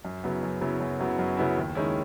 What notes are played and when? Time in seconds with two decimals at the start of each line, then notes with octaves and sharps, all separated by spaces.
0.05 F#2
0.24 C#3 F#3 B3 E4
0.43 F#2
0.61 C#3 F#3 B3 E4
0.80 F#2
0.99 C#3 F#3 B3 E4
1.19 F#2
1.37 C#3 F#3 B3 E4
1.56 D#2
1.75 D#3 G#3 C#4 E4